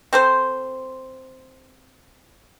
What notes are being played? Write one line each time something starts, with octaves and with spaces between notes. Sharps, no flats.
C4 A4 C5